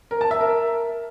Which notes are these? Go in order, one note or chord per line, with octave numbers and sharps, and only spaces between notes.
A#4
A5
E5
A#4